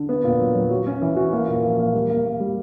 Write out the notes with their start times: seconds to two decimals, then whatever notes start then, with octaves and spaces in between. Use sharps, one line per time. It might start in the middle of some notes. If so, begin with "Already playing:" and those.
Already playing: D3
0.09 B3
0.24 A#2
0.40 F#3
0.54 F#3
0.70 F#4
0.86 C#4
1.02 E3
1.16 F#4
1.33 A#3
1.47 A#2
1.64 F3
1.79 A#3
1.94 G3
2.10 A#3
2.25 A#3
2.40 G3